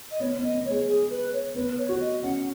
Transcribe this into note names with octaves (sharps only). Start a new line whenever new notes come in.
D#5
B3 C#5
B3
D#5
B3
C#5
G#3
G#4
B4
C#5
B3 B4
C#5
F#4
D#5
C#4 F#5